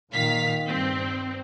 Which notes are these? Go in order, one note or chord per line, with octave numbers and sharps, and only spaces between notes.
A#2 D#3 F5 B6
G2 C4